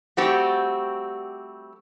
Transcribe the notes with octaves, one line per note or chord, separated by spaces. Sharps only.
G3 A3 C4 F#4 G4